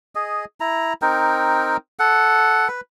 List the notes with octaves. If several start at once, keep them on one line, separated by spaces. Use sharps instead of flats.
G#4 D#5
E4 A#5
C4 D#4 A#4 G5
A4 F#5
B4